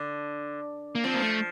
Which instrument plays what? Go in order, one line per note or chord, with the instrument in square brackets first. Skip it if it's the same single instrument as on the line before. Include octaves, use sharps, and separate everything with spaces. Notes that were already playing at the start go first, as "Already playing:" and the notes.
Already playing: [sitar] D3
[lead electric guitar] A#3
[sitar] F3 [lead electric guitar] C4
[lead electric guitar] A#3
A3